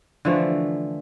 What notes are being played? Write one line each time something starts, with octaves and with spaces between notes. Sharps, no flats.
D3 E3 F3 A3